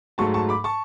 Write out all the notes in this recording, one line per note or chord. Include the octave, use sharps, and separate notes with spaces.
G#2 F#3 A3 A5 C#6
A5 C#6
B5 D6
A5 C#6